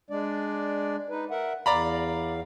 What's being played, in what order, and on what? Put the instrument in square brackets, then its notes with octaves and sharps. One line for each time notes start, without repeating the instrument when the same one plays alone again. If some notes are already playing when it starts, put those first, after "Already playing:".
[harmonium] G#3 D4 D5
D#4 B4
A#4 E5 F#5
[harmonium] E2 F5 [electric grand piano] D5 A#5 B5